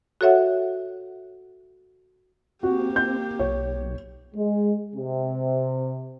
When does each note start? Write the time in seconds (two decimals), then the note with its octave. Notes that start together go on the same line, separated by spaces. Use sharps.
0.21 F#4 A4 C#5 E5 F#5
2.63 A#3 C4 F#4 G4
2.96 G6
3.39 B1 C#5
4.35 G#3
4.95 C3